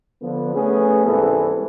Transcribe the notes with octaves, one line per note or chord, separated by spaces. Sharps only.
D3 F3 B3
A3 B3 C#4 G#4
C2 G#2 E3 B3 A4